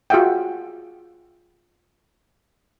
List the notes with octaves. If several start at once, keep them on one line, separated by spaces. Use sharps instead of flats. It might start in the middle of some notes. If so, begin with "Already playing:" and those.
F4 F#4 G#4 E5 F#5 G5